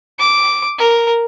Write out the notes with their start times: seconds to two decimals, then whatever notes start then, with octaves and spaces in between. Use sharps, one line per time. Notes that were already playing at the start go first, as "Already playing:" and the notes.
0.19 D6
0.78 A#4